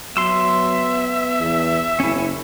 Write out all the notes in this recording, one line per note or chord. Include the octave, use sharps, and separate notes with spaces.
F#3 B3 E5 C6 E6
E2
F#1 C#4 E4